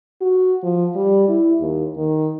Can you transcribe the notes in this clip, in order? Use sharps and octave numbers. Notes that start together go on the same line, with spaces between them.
F#4
F3
G3
E4
D#2
D#3